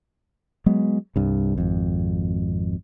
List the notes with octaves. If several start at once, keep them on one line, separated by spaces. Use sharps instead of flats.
F#3 G#3 B3
C2 G2
G#1 F2